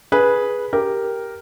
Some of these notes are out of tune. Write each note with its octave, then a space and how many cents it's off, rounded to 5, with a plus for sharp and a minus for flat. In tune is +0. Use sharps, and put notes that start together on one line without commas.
G#4 +0 B4 -10
G4 +0 A#4 +0